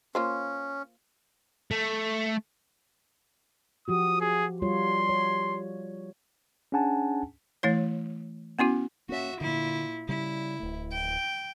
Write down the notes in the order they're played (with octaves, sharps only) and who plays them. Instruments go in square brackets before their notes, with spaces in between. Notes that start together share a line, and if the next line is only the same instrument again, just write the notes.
[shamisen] A#3 F4 C5 [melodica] C#4
[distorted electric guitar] A3
[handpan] F3 F#4 G4 [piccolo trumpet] D#6
[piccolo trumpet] G#4
[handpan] G3 F4 C#5 [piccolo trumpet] C6
[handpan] C#5
[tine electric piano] C#4 D4 G#4 F#5 G#5 A5
[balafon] E3 A3 E4 C#5
B3 C#4 E4 F#4
[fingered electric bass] A#3 C#4 [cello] F#4 E5
[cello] A#2 E4 [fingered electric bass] D3
[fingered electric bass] C#3 G3 [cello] E4
[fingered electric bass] D1 A3
[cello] G5